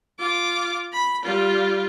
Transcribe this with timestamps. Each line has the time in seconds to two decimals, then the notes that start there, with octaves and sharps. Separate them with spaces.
0.19 F4 D6
0.93 B5
1.24 G3 F4